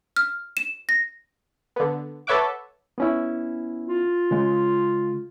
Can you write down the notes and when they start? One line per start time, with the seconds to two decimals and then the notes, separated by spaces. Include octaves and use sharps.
0.17 F6
0.57 E7
0.89 A#6
1.76 D3 B3
2.27 A4 B4 C#5 E5 F#5 D6
2.98 B3 C#4 E4
3.87 F4
4.31 C#3 G#3